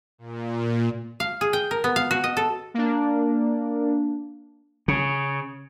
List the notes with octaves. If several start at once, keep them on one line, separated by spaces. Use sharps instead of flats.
A#2
F5
G#4
G5
A#4
B3
F5
F#4
D#5
A4
A#3 D4
C#3